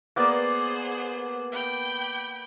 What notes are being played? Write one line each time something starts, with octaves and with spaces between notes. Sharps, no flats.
A#3 B3 G#4 C5 D5 F#5
G5 B5 G6